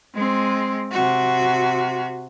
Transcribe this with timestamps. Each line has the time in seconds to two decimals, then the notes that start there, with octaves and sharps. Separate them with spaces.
0.15 G#3 C4
0.91 C3 F#4